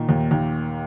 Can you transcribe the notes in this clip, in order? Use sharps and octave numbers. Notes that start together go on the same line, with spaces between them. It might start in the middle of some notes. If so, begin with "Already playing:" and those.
Already playing: A#2 D#3
D#2
D#2